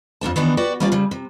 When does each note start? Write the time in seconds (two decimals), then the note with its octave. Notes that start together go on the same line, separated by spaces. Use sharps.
0.21 F2 G#2 D4 A5
0.36 D#3 E3 B3 D4
0.57 F#4 G4 B4 D5
0.80 G3 A#3 C#4 F4 C5 D5
0.92 C#3 G3
1.11 C3